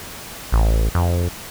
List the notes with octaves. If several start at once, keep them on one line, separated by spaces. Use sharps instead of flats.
A1
F2